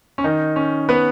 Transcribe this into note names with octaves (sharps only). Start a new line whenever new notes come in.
C#4
D#3 D#4
C#4
B3 B4